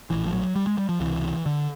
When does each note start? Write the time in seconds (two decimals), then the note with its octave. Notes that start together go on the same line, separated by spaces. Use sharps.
0.10 A#1 A2 E3
0.26 F3
0.33 F#3
0.56 G3
0.67 G#3
0.78 G3
0.89 F3
1.00 C#2 C3 E3
1.46 D3